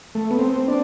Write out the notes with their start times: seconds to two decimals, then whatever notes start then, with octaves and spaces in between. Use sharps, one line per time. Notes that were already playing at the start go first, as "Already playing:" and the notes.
0.15 A3
0.31 B3
0.38 C4
0.68 D4